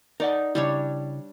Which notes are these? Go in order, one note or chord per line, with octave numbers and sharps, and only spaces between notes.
D#4 A#4 D5 F#5
C#3 G3 D4 E4 C#5